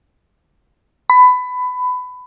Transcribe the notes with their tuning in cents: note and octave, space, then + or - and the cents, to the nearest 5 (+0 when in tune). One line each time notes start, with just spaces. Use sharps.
B5 +20